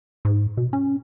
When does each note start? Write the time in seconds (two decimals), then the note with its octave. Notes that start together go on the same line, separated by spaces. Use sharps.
0.25 G#2
0.57 B2
0.73 C#4